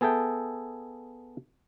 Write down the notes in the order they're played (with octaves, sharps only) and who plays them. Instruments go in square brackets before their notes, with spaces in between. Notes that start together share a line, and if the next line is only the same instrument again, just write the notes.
[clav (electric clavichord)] B3 G#4 A4 E5 G5